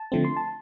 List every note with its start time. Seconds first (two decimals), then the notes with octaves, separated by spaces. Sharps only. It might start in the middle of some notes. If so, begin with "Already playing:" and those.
Already playing: A5
0.12 D3 F3 A3 C4
0.24 C6
0.37 A5